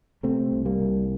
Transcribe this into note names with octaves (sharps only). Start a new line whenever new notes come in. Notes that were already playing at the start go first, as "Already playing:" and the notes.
C3 A3 C4
C2
G3 A#3
C2